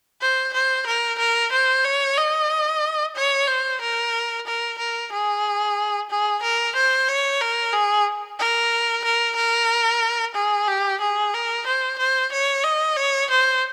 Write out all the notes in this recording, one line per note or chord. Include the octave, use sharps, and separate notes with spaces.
C5
C5
A#4
A#4
C5
C#5
D#5
C#5
C5
A#4
A#4
A#4
G#4
G#4
A#4
C5
C#5
A#4
G#4
A#4
A#4
A#4
G#4
G4
G#4
A#4
C5
C5
C#5
D#5
C#5
C5